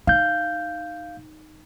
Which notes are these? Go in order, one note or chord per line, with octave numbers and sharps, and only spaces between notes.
D#4 F5 G6